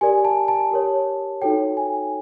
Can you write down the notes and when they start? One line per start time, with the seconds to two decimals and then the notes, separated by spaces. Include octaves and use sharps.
0.01 G4 A#4 D5 G#5
0.25 A5
0.48 A5
0.71 G4 A#4 C#5
1.42 D#4 F#4 A4 C#5 G5
1.77 G#5